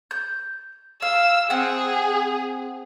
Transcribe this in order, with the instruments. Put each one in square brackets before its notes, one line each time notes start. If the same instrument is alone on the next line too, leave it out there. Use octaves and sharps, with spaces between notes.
[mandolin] G6
[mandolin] F5 [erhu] E6
[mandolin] C4 F#5 [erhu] G#4